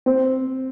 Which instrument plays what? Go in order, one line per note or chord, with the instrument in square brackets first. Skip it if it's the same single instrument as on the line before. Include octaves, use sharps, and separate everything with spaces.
[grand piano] C4